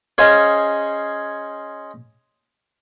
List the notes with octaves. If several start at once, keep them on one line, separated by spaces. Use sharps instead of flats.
C#4 G#4 C5 D#5 F5 G#5